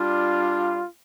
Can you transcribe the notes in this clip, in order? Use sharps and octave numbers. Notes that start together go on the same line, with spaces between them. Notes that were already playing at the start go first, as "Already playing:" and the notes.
Already playing: G3 D4 F4